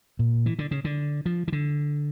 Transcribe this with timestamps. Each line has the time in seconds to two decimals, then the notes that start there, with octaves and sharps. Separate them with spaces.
0.19 A#2
0.46 E3
0.59 D3
0.71 C#3
0.85 D3
1.26 F3
1.48 E3
1.53 D3